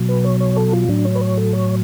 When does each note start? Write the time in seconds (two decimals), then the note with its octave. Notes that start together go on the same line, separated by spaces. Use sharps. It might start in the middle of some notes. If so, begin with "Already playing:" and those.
Already playing: B2 F#3
0.09 B4
0.24 C#5
0.40 C#5
0.57 A4
0.73 F4
0.88 A2 F#3 D4
1.05 C#5
1.15 B4
1.21 C#5
1.37 A4
1.53 C#5